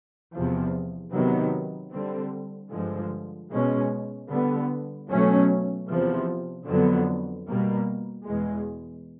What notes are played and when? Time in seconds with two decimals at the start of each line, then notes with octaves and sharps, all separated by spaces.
0.33 E2 C3 F3
1.13 C3 D#3 F#3 B3
1.92 D3 G3 C4
2.71 G2 D3 F3 G#3
3.51 B2 G#3 C#4
4.29 D3 G3 B3
5.10 B2 F#3 A3 C#4
5.88 E2 C3 F3
6.68 F2 D3 F#3 B3
7.47 B2 G3 A#3
8.26 E2 B2 G#3